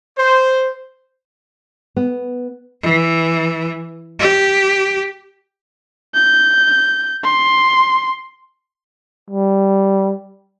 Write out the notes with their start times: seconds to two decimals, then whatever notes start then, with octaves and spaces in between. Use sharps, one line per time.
0.18 C5
1.96 B3
2.82 E3
4.20 G4
6.14 G6
7.24 C6
9.30 G3